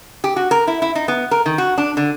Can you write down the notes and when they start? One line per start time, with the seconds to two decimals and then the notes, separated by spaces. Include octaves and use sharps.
0.24 G4
0.36 F#4
0.51 A#4
0.67 E4
0.82 E4
0.95 D#4
1.08 B3
1.31 A#4
1.46 D#3
1.58 F#4
1.78 D4
1.97 D3